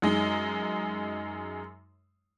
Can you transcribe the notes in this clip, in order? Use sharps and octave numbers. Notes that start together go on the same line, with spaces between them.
F#2 G#3 D#4